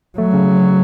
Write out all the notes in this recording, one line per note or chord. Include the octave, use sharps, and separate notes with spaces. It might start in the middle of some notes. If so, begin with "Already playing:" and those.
F#3 A3
C#3